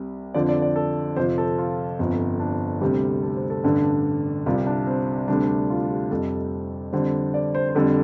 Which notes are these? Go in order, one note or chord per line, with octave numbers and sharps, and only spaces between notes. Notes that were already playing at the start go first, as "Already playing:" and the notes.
Already playing: C2 C3 G3
F2 D3 F3 D5
D5
D5
A4
F2 C3 F3 C5
A4
F4
G1 F2 F3
D4
D2 C3 G3 G4
A4
C5
A4
A1 G2 D3
C2 C3 G3 F4
D4
C4
D2 C3 G3 D4
F4
G4
F1 F2 C3 G3 A4
F2 D3 G3 C5
D5
C5
C5
F2 D3 G3 A4